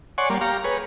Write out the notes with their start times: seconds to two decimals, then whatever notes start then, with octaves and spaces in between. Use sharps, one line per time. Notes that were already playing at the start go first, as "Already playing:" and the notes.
0.18 C#5 D5 F#5 G#5 C6 C#6
0.30 G3 A#3
0.41 G4 F5 A#5
0.64 G#4 B4 C#5